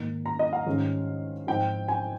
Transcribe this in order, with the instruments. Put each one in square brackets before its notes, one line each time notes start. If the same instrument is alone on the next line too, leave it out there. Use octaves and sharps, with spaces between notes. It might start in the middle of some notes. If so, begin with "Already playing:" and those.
Already playing: [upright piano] G#2 D#3 A#3 D#4
A#5
D#5
F5
G#2 D#3 G3 C#4
G#2 F3 C4 D#4 G5
G#5